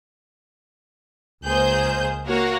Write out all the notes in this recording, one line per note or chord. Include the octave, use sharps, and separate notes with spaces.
C#2 A#3 G#4 C5 G6
A#3 F#4 A#4 C#5 F5 F#5